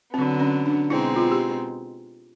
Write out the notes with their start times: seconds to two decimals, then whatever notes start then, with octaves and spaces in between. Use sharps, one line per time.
0.13 D3 F#3 B3 C4
0.40 C#4
0.66 D4
0.90 B2 G#3 C4 D#4 E4
1.16 F4
1.32 G4